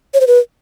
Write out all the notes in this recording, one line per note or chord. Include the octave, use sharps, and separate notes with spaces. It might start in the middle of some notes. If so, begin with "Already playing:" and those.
C#5
C5
B4